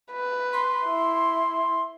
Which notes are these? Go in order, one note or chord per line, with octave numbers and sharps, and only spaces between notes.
B4
C6
E4